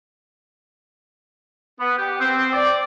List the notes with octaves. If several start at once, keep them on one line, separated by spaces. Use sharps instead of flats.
B3
G4
C4
D5